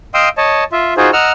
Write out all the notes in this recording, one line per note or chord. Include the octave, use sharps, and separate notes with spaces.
D#5 F5 G5 C6 D#6 E6
C#5 D#5 A5
F4 E5
D#4 F4 F#4 G#4 C5
D#5 F#5 A#5 E6 F6